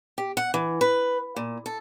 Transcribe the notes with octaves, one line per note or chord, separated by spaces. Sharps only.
G4
F#5
E3
B4
A#2
A4